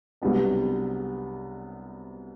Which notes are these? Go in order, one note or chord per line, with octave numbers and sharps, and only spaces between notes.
C2 C3 F#3 B3 D4